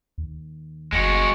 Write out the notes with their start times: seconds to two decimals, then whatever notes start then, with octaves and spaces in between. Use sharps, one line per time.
0.18 D#2
0.93 F#1 G#3 F#4